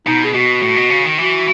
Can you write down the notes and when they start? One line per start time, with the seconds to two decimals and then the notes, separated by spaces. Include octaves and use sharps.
0.07 B2 D#4
0.24 G#4
0.34 B2 F#4
0.62 A2
0.77 B2
0.90 C#3
1.04 D#3
1.18 E3 F#4